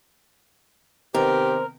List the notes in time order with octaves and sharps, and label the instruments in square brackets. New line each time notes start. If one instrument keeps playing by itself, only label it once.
[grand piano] C3 D#3 B3 [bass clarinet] G4 [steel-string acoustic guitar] A#4 [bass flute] C5